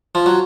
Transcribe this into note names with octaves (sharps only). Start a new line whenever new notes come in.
F3
F#3